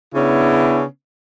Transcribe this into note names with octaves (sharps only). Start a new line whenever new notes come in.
C#3 B3 C#4 D4 E4